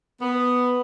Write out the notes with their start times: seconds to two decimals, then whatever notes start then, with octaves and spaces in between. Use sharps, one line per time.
0.21 B3